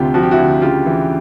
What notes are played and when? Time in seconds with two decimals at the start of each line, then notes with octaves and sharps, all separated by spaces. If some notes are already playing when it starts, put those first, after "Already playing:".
Already playing: D2 C3 F4 G4
0.14 F3 F#4
0.23 G4
0.31 E4 F#4
0.39 D2
0.62 C#3 F4 G4
0.86 E3